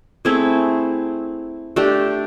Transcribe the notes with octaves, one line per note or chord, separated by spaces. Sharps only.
A3 C4 E4 G#4
A3 D4 G4